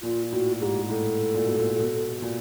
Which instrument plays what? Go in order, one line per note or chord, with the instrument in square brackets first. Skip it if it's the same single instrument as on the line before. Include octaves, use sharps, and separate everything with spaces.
[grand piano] A#2 [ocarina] F4
[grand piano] A2 [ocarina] F#4
[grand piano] G#2 [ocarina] G4 G#4
[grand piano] A2 [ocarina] A4
[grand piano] A#2
B2
A#2
B2
A#2